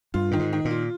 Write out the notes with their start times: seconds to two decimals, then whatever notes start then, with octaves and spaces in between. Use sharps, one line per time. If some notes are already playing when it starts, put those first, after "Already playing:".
0.14 G2 F4
0.31 A#2 D#3
0.39 G#2
0.53 D#3
0.65 A#2
0.71 F4